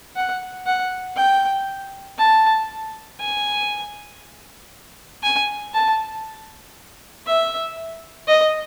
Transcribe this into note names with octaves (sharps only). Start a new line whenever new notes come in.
F#5
F#5
G5
A5
G#5
G#5
A5
E5
D#5